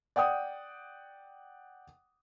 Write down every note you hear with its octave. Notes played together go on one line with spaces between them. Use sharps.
D5 F#5 G5 D#6